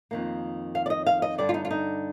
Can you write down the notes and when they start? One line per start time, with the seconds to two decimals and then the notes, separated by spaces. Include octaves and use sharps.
0.11 F2 D#3 A#3
0.75 F5
0.86 D5
0.90 D#5
1.06 F5
1.22 D#5
1.38 G2 D3 G3 D5
1.49 F4
1.54 D#4
1.65 F4
1.71 D#4